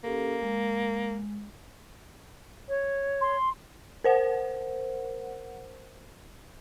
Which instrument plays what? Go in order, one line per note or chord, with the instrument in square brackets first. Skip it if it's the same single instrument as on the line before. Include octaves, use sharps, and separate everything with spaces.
[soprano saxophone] A#3 [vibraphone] C#4 G4 A4
[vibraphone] G#3
[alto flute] C#5
[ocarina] C6
[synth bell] A#4 C5 F#5